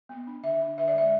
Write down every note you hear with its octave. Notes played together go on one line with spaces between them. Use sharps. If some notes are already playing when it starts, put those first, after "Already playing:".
B3
D4
D3 E5
D4
D3 E5
D5
G#3 E5